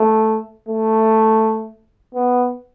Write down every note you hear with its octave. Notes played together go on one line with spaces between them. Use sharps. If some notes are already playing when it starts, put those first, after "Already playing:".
Already playing: A3
A3
B3